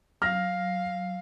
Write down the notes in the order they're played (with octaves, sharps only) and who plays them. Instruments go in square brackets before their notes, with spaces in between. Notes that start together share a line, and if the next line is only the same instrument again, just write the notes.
[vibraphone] F#3 [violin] F5 [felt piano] F6 A#6